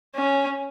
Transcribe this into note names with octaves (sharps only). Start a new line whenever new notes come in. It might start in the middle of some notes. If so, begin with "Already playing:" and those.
C#4